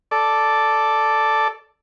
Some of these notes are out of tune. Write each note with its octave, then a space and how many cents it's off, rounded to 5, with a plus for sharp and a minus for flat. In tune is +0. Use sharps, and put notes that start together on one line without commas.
A4 +0 D5 +0